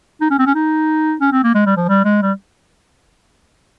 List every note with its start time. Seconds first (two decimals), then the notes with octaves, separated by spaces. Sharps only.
0.21 D#4
0.30 C#4
0.39 C4
0.46 C#4
0.55 D#4
1.21 C#4
1.32 C4
1.44 A#3
1.55 G#3
1.66 G3
1.77 F3
1.88 G3
2.05 G#3
2.22 G3